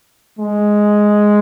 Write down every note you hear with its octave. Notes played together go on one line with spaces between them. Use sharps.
G#3